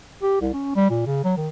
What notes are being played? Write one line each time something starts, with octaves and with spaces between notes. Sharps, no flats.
G4
C2
C#4
G3
A#2
C#3
F#3
D#3